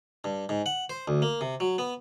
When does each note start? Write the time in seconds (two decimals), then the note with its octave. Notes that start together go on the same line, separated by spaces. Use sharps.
0.24 G2
0.49 G#2
0.66 F#5
0.90 C5
1.08 D2
1.22 A#3
1.41 C3
1.60 F#3
1.78 B3